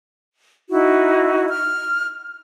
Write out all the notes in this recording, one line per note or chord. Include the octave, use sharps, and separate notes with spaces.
D#4 E4 F#4
F6